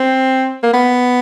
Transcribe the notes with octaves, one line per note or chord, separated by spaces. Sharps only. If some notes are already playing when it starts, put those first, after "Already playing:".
Already playing: C4
A#3
B3